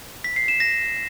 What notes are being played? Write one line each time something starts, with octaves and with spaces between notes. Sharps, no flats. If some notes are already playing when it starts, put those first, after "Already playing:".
B6
C7
E7
A#6